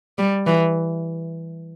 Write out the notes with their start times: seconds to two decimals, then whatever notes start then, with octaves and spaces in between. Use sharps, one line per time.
0.18 G3
0.47 E3